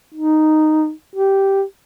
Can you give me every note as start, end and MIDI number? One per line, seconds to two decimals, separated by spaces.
0.14 0.91 63
1.16 1.63 67